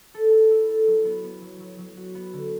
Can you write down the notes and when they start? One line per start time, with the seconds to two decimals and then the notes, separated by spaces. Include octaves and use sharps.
0.14 A4
0.32 A4
0.51 E4
0.69 A4
0.87 F#3
1.05 B3
1.24 B3
1.42 F#3
1.60 F#3
1.78 F#3
1.97 F#4
2.15 B3
2.33 D3